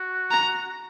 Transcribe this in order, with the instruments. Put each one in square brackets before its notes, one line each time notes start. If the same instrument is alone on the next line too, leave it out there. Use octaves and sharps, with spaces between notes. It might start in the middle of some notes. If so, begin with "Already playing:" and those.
Already playing: [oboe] F#4
[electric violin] A#5